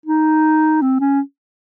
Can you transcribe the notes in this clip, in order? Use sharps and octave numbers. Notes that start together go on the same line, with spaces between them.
D#4
C4
C#4